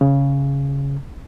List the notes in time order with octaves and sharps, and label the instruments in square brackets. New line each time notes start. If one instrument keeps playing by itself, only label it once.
[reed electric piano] C#3